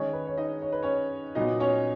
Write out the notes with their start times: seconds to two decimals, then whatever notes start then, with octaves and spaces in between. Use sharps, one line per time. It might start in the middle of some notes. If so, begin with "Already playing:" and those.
Already playing: D#3 G#3 C#4 D#4 C#5
0.13 B4
0.27 C#5
0.38 D#4 D#5
0.62 C#5
0.72 B4
0.83 C#4 C#5
1.35 A#2 F#3 B3 D#4 D#5
1.60 C#4 C#5